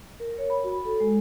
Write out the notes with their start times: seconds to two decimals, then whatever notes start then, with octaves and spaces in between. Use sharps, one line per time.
0.20 A#4
0.38 C#5
0.50 B5
0.64 F#4
0.85 A4
1.00 G#3